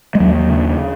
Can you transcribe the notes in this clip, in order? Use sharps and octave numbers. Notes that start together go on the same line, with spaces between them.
G#3
D#2 F#3
C#3